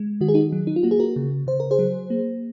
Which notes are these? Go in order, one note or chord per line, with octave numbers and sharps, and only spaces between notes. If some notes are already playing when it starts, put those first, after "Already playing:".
Already playing: G#3
D#3 F#4
G#4
D#4 F#4
F#3
D#4
F4
A#3 F#4
G#4
F#4 A#4
C#3
C#3 C5
A#4
G#4 C5
F#3
A#3